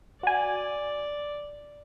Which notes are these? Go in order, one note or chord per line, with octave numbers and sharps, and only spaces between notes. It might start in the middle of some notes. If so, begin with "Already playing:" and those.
F#4 D5 G#5